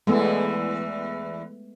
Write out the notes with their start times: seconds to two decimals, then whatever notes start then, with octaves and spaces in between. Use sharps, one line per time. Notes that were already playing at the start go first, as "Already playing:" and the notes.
0.07 E2 E3 G#3 A3 B3